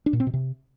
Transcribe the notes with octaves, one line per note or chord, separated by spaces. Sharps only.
D4
A#2
C4
B2
C3